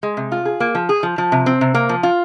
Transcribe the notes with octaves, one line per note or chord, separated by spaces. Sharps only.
G#3
C3
F4
G#4
A#3
F3
G#4
F3
F3
C3
C4
C3
A#3
F3
F4